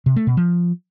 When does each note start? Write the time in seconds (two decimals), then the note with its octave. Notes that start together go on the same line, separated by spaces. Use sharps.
0.06 C3
0.16 A3
0.27 B2
0.37 F3